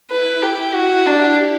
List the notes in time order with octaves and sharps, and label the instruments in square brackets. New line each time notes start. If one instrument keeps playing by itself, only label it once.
[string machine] E4 [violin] B4
[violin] G4
[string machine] E4 [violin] F#4
[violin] D4 [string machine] G4